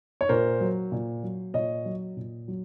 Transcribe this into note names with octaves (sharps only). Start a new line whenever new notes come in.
C#5
A#2 A#4 C5
F#3
A#2
F#3
A#2 C#5 D#5
F#3
A#2
F#3